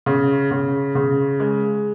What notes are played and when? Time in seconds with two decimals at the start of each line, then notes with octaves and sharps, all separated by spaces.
0.06 C#3
0.51 C#3
0.95 C#3
1.40 G#3